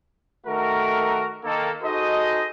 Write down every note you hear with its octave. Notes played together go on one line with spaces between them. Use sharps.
D#3 A3 F#4 A4 A#4
D#3 A#3 A4
D#4 F#4 G#4 A4 C5 D#5